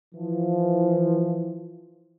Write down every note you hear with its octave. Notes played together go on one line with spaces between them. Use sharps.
E3 F3